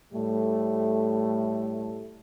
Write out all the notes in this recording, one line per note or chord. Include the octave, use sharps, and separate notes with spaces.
A2 G3 A3